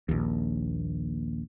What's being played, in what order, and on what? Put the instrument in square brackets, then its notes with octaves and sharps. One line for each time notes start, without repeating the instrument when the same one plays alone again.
[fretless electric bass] A#1 D#2